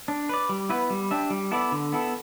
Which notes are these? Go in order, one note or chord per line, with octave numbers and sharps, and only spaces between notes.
D4
B4 D5
G3
B3 E4 B4
G3
D4 G4 E5
G3
B3 E4 A4 D5
D3
B3 E4 A4